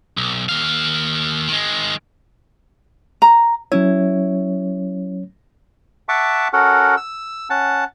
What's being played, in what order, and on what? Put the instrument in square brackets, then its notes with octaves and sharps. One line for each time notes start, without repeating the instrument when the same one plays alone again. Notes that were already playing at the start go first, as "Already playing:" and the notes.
[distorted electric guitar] B1
D#2 F5
D#3 G#3
[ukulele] A#5
[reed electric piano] F#3 C#4 C#5 [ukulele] E4
[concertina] E5 F#5 A5 C#6 D6
C#4 F#4 A4 A#4 F#5
E6
C#4 F#5 A5